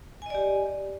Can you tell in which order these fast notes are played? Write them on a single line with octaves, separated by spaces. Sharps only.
G#5 D#5 D5 G4